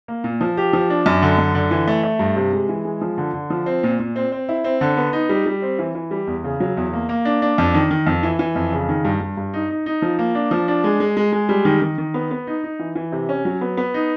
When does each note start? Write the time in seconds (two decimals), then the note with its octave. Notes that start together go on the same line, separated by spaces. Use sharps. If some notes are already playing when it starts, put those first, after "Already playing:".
0.08 A#3
0.24 A#2
0.41 F3
0.57 G4
0.73 F3
0.90 D4
1.06 F#2
1.22 D3
1.38 F#2
1.55 D3
1.71 E3
1.87 A3
2.03 A3
2.19 G2
2.36 C3
2.53 G#3
2.69 E3
2.85 G#3
3.01 F3
3.18 D3
3.34 D3
3.50 F3
3.66 C4
3.83 A#2
3.99 A#2
4.16 C4
4.32 C4
4.49 E4
4.64 C4
4.81 D3
4.97 B3
5.13 D#4
5.29 G3
5.46 G3
5.62 C4
5.79 E3
5.95 E3
6.11 G3
6.27 E2
6.44 C#3
6.60 F#3
6.77 E2
6.93 A#3
7.09 A#3
7.25 D4
7.42 D4
7.58 F2
7.74 D#3
7.91 D#3
8.07 F2
8.23 E3
8.39 E3
8.56 F2
8.72 C#3
8.89 D#3
9.05 G2
9.21 G2
9.37 G2
9.54 D#4
9.70 D#4
9.86 D#4
10.02 F3
10.19 A#3
10.35 D4
10.51 F3
10.68 D4
10.84 G#3
11.00 G#3
11.17 G#3
11.32 G#3
11.49 G3
11.65 D#3
11.82 D#3
11.98 D#3
12.14 B3
12.31 B3
12.47 D#4
12.64 D#4
12.79 E3
12.95 E3
13.12 C3
13.29 C#4
13.45 F#3
13.61 B3
13.77 B3
13.94 D#4